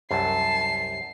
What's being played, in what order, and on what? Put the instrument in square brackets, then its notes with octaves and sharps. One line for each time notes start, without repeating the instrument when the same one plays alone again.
[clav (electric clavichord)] C2 F#2 [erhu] A5 [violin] C7